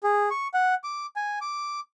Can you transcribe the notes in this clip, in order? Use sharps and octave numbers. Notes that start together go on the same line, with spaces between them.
G#4
C#6
F#5
D6
G#5
D6